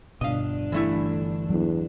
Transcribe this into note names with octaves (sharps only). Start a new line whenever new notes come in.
G1 B2 D4 D#5 F5
E3 A3 E4
D3
E2 F#3